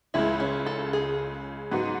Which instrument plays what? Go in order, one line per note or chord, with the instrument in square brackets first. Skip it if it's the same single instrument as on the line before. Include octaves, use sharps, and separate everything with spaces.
[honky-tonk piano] C#2 C#3 G#3 [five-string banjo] E4
[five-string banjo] C#4
A4
G#4
[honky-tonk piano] G#2 F#3 B3 D#4 F#4